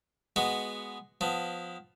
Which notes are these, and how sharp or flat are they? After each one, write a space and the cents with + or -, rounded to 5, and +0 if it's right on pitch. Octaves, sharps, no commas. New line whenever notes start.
G#3 +0 B3 +0 F#4 +0
F3 +25 B3 +25